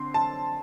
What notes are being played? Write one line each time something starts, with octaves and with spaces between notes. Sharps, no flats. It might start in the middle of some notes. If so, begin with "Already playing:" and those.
Already playing: D3 C4 C6
A5